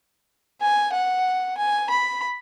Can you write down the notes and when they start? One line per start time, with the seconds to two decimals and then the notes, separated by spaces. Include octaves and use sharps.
0.61 G#5
0.93 F#5
1.57 G#5
1.90 B5